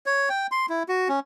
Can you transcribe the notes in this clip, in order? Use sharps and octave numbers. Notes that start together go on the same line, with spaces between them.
C#5
G5
C6
E4
F#4
C#4